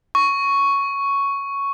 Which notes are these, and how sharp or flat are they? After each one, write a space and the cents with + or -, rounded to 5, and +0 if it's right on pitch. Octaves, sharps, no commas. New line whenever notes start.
C#6 +5